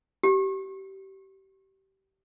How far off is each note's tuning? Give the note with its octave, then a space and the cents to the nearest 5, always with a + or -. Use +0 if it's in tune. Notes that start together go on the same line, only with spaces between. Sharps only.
G4 -25